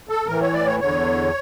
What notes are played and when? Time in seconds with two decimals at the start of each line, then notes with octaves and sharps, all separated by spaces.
0.09 A4
0.26 A2 E3 A#4
0.40 C#5
0.53 D5
0.66 C#5
0.79 E2 D3 C#5